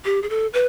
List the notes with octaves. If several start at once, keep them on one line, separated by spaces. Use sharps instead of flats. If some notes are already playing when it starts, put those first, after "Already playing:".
G4
G#4
A4
B4